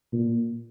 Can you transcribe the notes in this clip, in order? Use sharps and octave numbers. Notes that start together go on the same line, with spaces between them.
A#2